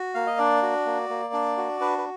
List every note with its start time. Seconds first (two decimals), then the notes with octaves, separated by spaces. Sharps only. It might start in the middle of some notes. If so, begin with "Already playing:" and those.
Already playing: F#4
0.15 A#3 F5
0.27 D#5
0.38 D4 D5
0.62 F#4
0.86 A#3
1.09 A#3
1.33 D4
1.57 F#4
1.81 D4 B4
1.98 B4